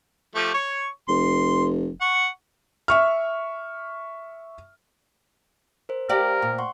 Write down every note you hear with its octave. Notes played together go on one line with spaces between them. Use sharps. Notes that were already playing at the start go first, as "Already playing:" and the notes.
F3 A3 G4
C#5 C#6
F1 C6
F#5 C#6
E5 C#6 F6
A#4 C5
G4 A#4 C5 D5 F5
A#2
F#5 C6 C#6